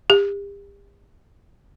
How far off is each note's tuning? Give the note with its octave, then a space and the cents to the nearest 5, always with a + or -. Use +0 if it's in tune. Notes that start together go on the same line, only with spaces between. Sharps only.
G4 +40